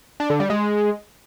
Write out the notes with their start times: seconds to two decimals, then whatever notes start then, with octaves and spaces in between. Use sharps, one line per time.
0.20 D4
0.30 D3
0.40 G3
0.50 G#3